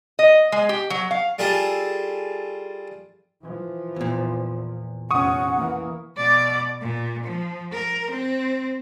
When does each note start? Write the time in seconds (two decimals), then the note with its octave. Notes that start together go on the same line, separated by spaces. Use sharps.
0.19 D#5
0.52 G#3
0.69 G4
0.90 F#3
1.11 F5
1.38 G3 F4 G#4 A4 E5
3.42 E3 F3
3.96 E2 A#2
5.11 F1 C#4 F#5 C#6 D#6
5.55 E3 A#3
6.17 B2 D5
6.81 A#2
7.23 F3
7.73 A#4
8.10 C4